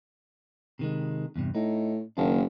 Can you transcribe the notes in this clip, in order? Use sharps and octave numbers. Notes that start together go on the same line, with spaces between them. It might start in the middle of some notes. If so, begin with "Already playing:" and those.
C3 D#3 G#3
E2 G2 C3
A2 D#4
F#1 D#3 A#3 D4